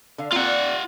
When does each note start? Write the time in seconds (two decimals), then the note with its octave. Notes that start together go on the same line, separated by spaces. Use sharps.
0.18 D3 F5
0.33 A#3 C4 F4 D5 F#5